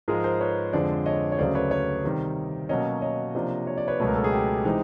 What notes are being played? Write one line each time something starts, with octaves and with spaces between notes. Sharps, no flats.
G#2 F3 G#3 G#4 A#4
A#4 C5
B4 C#5
F2 D3 F3 G#3 C5 D5
C#5 D#5
C#5
D2 C#3 F#3 C5 D5
B4 C#5
B4 C#5
C3 D#3 G3
B2 F#3 A#3 C#4 C#5 D#5
C#5 D#5
C3 F3 A#3 D4
C#5
D5
B4 C#5
C#2 B2 F#3 A3 B4
A#4
A4
G#4
G4
C3 E3 G#3 C4 D#4